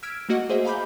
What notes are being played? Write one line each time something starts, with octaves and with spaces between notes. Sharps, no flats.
E6 F6 G#6 B6 D7
A3 A#3 F#4 D#5 F#5
G#4 C5 D#5 E5
F5 G#5 A#5 B5 D6 G6